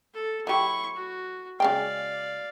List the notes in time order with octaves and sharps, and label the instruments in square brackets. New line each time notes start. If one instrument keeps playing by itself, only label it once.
[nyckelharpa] A4
[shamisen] F#3 G4 [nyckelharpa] E4 C#6
[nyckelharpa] F#4
[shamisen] C#3 G#3 G5 [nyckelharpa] D5 F5